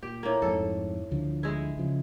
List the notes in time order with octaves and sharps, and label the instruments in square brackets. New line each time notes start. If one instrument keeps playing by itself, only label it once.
[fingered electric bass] A#2 [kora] G4
[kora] A2 A#3
[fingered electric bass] F2 G#2 [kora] A4
[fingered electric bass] D2 D3 F3
[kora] G#3 E4
[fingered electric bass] C#3 F3